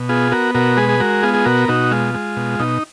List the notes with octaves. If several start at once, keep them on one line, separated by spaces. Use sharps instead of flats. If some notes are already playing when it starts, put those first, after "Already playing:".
Already playing: B2
B3 F4 G#4
B3 F#4 A#4
B2 F#4 A#4
G#3 G#4 B4
G#4
G#3 F#4 A#4
B3 F4 G#4
G#4
B2 F#4 A#4
B2 D#4 F#4
G#3 F4
G#3
B2
B2 D#4